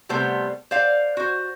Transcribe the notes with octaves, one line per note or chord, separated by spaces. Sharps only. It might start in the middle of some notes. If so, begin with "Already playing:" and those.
C3 G3 A3 B3 C5
C5 D5 F5
F#4 C5